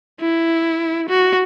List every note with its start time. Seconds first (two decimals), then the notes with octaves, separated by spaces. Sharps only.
0.20 E4
1.09 F#4